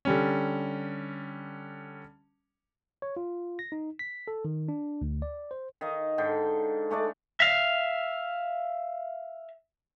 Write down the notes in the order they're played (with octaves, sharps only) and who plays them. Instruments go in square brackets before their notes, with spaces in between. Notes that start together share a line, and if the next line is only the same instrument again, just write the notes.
[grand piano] D3 G3 C#4
[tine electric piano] C#5
F4
A#6
D#4
B6
A4
D#3
D4
D2
D5
C5
[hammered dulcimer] D#3 D#5 F5
G#2 D3 G5
G#3 A3 D4 D5
[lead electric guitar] E5 F5